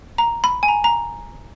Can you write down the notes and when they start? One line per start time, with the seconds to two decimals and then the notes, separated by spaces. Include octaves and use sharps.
0.18 A#5
0.44 B5
0.63 G#5
0.68 A#5
0.84 A#5